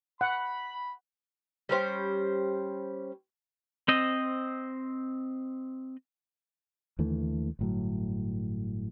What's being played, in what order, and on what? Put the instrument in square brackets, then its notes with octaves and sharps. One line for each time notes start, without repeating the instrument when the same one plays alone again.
[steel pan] F#5 [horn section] B5
[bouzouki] G3 C#4 C5 G5
[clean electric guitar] C4 C5 D#5
[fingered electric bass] D#2 D3 E3 A3
G1 A2 F#3